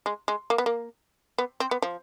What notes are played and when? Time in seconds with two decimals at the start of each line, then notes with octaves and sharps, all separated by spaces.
0.06 G#3
0.28 G#3
0.50 A#3
0.58 B3
0.66 A#3
1.38 B3
1.60 C4
1.71 B3
1.82 F3